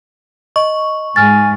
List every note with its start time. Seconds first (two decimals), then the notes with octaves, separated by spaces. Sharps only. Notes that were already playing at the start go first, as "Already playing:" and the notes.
0.56 D#5 C#6
1.16 G#2 G#5 F6 A6